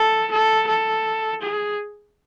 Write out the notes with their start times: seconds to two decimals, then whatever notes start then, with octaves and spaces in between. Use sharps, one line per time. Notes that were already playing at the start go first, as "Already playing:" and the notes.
Already playing: A4
0.31 A4
0.67 A4
1.41 G#4